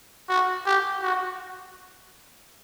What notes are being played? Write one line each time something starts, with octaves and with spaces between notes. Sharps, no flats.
F#4
G4
F#4